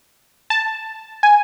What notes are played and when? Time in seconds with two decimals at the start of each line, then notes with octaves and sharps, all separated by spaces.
0.50 A5
1.23 G#5